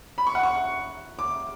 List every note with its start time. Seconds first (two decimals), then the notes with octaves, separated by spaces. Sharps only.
0.18 B5
0.27 C#6
0.35 F#5
0.43 C#6
1.19 D6